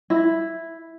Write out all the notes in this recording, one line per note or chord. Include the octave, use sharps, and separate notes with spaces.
E4